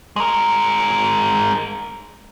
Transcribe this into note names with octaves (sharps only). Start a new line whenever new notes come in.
G#3 A#4